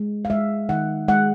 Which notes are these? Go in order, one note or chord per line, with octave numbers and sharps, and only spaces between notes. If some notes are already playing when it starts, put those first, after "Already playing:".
Already playing: G#3
F5
G#3 E5
D#3 F#5
G#3 F#5